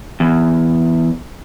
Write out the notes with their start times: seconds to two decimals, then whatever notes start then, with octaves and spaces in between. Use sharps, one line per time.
0.20 E2